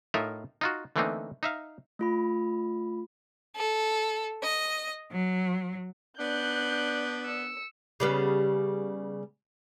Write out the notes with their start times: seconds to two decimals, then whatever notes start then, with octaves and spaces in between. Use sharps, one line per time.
0.14 A2 D#4 F4 A#4 E5
0.61 D#4 F4 F#4
0.96 D3 E3 A3 A#3 C4 D#4
1.43 D#4 E5 F5
1.99 A3 F4 B5
3.55 A4
4.43 D#5
5.12 F#3
6.19 B3 D4 F#6 G6
7.26 E6 C#7
8.00 C#3 G3 B3